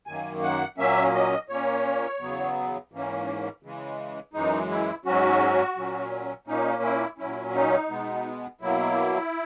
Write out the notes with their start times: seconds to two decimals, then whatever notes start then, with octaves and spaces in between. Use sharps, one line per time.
0.07 F#2 D#3 A#3 G#5
0.43 F#5
0.78 A#2 F#3 A#3 C#4 E5
1.14 D#5
1.49 A#2 A#3 C#4 C#5
2.21 E2 C#3 F#3 B3
2.92 G#2 E3 A#3 C#4
3.63 C#3 E3 G#3
4.33 F#2 E3 G#3 D#4
4.70 E4
5.05 G#2 F#3 C#4 F#4
5.77 A#2 F#3 C#4
6.47 A#2 A#3 C#4 D#4
6.83 E4
7.18 A#2 F#3 C#4 E4
7.54 D#4
7.90 B2 G#3 B3
8.61 B2 F#3 A#3 E4